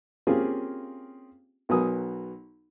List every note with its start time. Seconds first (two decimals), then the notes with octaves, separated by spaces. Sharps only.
0.27 A#3 C4 C#4 F4 G4 G#4
1.69 B1 F#3 B3 A#4 G#5 D#6